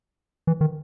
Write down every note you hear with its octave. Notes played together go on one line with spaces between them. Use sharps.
E3
D#3